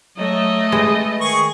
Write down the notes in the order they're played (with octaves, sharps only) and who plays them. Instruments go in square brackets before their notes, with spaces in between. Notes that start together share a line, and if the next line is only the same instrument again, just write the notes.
[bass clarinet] F#3 [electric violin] A3 D#5
[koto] G#3 [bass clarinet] B4
[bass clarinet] D#3 [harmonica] G#4 C#6